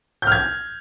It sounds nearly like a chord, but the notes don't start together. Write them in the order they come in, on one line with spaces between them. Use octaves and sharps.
G6 F6 G#6